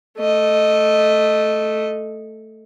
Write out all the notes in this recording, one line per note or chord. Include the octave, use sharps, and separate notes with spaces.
A3 D#5